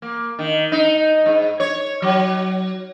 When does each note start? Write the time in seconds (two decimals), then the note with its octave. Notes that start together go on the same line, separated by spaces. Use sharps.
0.02 A#3
0.39 D#3
0.72 D#4
1.26 G#2
1.60 C#5
2.02 F#3